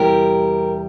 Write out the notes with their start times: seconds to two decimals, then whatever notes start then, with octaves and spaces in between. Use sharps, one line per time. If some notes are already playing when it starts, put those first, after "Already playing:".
Already playing: E2 C3 G3 G4 A#4